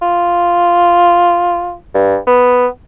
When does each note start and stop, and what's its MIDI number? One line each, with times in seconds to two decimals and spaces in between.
0.02 1.75 65
1.94 2.17 43
2.27 2.67 59